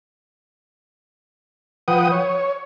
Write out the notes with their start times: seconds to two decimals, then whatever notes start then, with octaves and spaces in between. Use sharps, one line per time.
1.88 F3 B4 F#5 G5 D#6
2.12 C#5